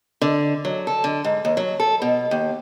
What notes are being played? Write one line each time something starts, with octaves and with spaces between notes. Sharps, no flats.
D3
F#3
A4
D3
G#2
D#2
F#3
A4
B2
D#2